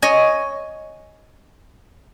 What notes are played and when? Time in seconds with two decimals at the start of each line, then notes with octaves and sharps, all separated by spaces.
0.02 C#5 D#5 G#5